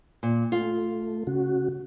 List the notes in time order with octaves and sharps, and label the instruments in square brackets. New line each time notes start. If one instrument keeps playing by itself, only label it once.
[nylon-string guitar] A#2
[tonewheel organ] A3 [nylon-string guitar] F4
[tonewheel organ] C#3 F#4